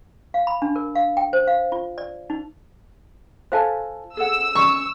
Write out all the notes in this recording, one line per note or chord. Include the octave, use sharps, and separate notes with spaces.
F5
B5
D4
A#4
F5
G5
C5
F5
F4
D5
D#4
F4 A4 C5 F5 G#5 A5
G#4 A4 F#5 E6
C#4 C#6